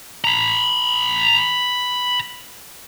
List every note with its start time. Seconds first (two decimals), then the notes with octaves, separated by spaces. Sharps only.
0.24 A#5 B5